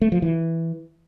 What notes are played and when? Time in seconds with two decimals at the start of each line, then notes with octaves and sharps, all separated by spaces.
0.02 A3
0.12 F3
0.22 E3